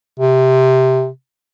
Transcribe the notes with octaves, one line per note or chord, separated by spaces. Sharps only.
C3